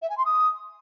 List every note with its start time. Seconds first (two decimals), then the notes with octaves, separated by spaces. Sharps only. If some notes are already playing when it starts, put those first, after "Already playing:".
0.02 E5
0.10 G#5
0.18 C6
0.25 D#6